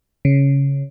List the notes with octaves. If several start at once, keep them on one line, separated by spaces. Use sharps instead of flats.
C#3